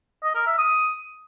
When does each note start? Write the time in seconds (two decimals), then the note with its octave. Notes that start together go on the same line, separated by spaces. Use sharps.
0.23 D#5
0.35 A#4
0.46 E5
0.58 D#6